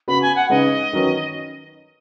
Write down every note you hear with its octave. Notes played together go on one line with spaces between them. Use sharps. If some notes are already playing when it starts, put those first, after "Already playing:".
C#3 B3 F#4 B4 B5
G#5
F#5
C#3 G#3 D#4 B4 D#5
D#3 F#3 C#4 B4